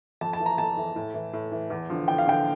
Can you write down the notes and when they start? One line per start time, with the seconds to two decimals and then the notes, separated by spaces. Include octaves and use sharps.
0.21 F2 A5
0.33 A5
0.40 E3
0.46 A#5
0.58 F2 A5
0.77 E3
0.96 A2
1.14 E3
1.33 A2
1.52 E3
1.70 E2
1.89 D3 F3
2.08 E2 G5
2.18 F5
2.27 D3 F3 G5